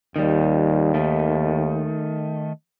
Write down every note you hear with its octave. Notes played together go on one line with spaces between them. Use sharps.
D#2 D#3 G3
D#3 A3